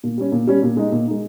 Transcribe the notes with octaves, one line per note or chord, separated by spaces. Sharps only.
A#2
G3 C#4
A#2
G3 C#4
A#2
G#3 D#4
A#2
G#3 D#4